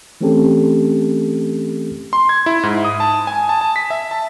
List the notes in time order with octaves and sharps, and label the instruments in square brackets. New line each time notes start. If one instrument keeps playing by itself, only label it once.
[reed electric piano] E3 A3 C4 C#4 G4 A4
[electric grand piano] C6
G#6
E4
G#2
D#6
A5
G#5
A5
A5
B6
E5
A5